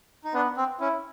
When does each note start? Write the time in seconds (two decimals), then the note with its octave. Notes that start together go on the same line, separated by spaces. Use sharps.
0.24 D#4
0.34 B3 D4
0.57 C4
0.80 C#4 E4